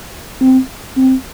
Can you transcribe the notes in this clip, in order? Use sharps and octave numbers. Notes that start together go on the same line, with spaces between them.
C4
C4